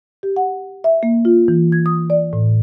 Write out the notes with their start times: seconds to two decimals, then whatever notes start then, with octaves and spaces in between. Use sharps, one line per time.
0.23 G4
0.36 F#5
0.84 E5
1.03 A#3
1.25 F4
1.48 E3
1.72 G#6
1.86 D#6
2.10 D5
2.33 A2